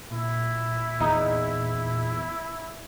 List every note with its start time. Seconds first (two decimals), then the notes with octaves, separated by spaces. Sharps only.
0.10 A#2 E4
1.01 E2 D#4